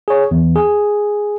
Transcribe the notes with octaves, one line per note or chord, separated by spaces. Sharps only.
G#4 C#5
E2
G#4